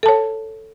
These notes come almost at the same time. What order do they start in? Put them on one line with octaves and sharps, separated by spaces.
A4 A5 C#5